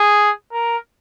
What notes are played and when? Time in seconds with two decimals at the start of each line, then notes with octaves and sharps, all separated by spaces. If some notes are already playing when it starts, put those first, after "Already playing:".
Already playing: G#4
0.52 A#4